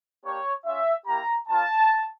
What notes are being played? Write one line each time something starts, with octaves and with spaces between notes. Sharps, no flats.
A#3 D4 G4 C#5
C#4 F4 E5
A#3 E4 G4 A#5
A#3 D4 F4 A5